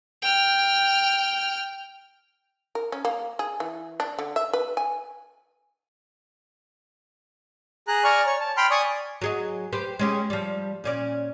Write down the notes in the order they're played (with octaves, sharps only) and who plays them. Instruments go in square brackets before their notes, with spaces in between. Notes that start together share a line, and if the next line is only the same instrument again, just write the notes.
[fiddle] G5 F6
[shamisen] A#4
C#4
A#3
G#4
E3
D4
D3
E5
B4
G#5
[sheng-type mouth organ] G#4 A#5 F#6
D5 G#5 A#5 C#6 F6
C#5
A5
G5 B5 C6 F6
D5 G#5 C#6 D#6
[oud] F#3 G#4 D#5
G4 B4 C5
G#3 C#4 G4
F3 G3
A#2 C#4 D5